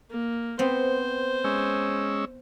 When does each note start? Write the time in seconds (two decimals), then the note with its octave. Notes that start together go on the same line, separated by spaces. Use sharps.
0.10 A#3
0.59 B3 C4 C5
1.44 G#3 C#4 E6